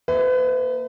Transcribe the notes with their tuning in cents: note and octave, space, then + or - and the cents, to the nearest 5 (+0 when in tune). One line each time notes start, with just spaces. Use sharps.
A#3 +0 B4 +40 E5 -20